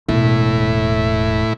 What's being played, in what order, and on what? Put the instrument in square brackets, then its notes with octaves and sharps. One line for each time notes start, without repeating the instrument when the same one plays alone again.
[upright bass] E1 [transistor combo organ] A2 E4